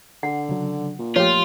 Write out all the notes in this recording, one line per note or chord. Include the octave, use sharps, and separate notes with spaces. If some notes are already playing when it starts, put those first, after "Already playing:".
D3 F#5
C#3 F#3
A#2
F3 A3 F4 G4 C#5